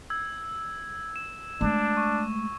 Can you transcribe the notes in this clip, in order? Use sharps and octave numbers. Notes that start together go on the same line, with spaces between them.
E6 G#6
E7
G#3 A3 D4
C#6